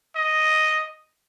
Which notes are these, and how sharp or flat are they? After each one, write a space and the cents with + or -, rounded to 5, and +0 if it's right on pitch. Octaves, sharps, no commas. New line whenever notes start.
D#5 +0